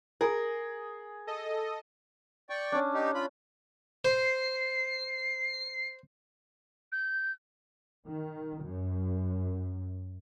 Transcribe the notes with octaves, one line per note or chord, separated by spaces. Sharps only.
G#4 A#4
A4 D#5
D5 G5 C#6
C#4 D4
D#4 G4
F4 B5
C5 C7
G6
D#3
F#2